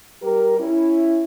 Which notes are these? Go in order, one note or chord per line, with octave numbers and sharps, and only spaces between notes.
G3 G4 A#4
C#4 E4